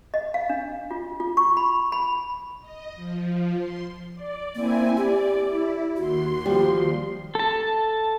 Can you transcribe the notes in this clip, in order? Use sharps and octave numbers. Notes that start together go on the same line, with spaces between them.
D#5
F5
D4
F4
F4
C#6
B5
B5
D#5
F3
C6
D5
A#3 C4 E4 G#5
G4 D5
E4
D#2 F#4 C6
F3 G3
A4 A5